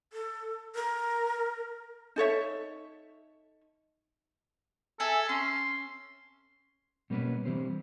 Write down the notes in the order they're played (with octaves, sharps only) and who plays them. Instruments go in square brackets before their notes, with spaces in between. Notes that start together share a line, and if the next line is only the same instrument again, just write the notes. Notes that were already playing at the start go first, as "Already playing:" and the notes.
[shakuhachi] A4
A#4
[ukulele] D#4 A4 C#5 E5
[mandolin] G#4 E5 [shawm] A4
[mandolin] C#4 [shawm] C6
[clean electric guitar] B2 G3 A#3 C#4 A#4 B4
E3 G3 C4 G4 C5